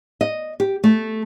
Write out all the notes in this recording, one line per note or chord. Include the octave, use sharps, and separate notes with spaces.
D#5
G4
A3